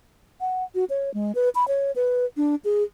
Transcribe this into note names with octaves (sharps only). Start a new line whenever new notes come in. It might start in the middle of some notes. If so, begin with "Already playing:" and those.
F#5
F#4
C#5
G#3
B4
B5
C#5
B4
D4
G#4